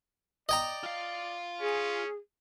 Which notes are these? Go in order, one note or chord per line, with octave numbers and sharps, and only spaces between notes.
D5 D#5 G5 A#5
F4 F5
C#4 G#4